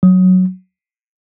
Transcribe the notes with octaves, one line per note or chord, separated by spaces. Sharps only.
F#3